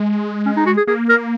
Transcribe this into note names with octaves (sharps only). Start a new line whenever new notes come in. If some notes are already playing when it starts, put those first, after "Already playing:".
Already playing: G#3
C#4
D#4
F#4
G#4
A#3 G#4
A#4